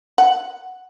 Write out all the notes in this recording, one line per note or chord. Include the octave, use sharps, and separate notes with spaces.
F#5